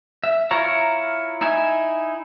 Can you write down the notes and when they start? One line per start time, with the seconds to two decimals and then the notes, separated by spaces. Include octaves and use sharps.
0.24 E5
0.51 E4 F4 C#5 E5 A#5
1.41 D#4 E4 E5 G#5